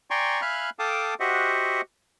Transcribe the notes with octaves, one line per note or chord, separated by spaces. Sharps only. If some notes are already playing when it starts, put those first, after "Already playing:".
D5 G5 G#5 A#5 C6 C#6
E5 F5 G#5 B5 F6 F#6
A4 F5 G5 A5 D6 D#6
F#4 G4 C5 D#5 E5 F#5